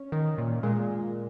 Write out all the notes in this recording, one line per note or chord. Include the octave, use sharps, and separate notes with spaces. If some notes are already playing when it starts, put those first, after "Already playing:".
Already playing: C#4
D#3
A#2
A#2 G#3